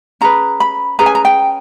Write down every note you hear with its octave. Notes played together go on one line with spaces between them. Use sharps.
C#4 G#4 B4 A#5
B5
C#4 G#4 B4 A#5
G#5
A#5
G5